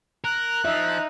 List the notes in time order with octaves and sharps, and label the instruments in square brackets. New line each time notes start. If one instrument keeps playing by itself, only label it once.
[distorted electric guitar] A#4 [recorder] F#6
[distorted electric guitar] F3 [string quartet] D#4 [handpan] E5